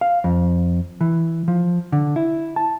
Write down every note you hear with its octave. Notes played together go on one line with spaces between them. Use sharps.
F5
F2
E3
F3
D3
E4
A5